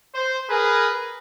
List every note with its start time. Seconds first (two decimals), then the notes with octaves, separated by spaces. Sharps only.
0.15 C5
0.50 G#4 A#4 B4